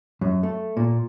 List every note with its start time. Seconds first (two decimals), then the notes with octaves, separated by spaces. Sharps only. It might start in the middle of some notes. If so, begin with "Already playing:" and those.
0.21 F#2
0.43 A3
0.77 A#2